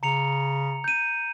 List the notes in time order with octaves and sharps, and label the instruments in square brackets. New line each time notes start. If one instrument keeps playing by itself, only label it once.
[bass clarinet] C#3 [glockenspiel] A#5 C#7 F7
[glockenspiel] G6 D#7